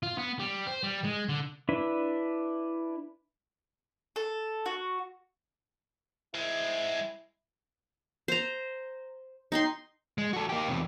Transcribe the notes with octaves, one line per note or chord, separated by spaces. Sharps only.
F4
B3
G3
C5
G3
G#3
D3
D4 E4 B4
A4
F#4
G#3 C4 E4
C5 A#5
D#4 G5 C6
G#3
F#4 A4
A#3 G4
E2 C3